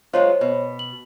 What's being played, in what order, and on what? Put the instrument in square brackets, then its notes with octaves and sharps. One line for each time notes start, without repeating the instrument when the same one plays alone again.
[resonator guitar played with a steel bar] F#3 G#3 F4 [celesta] C5 C#5
[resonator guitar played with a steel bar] B2
[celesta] F#7